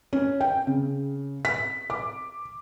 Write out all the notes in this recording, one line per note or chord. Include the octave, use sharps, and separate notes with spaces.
C#4
G5
C#3
B6
D6